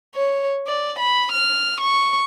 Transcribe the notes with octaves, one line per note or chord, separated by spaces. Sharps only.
C#5
D5
B5
F6
C#6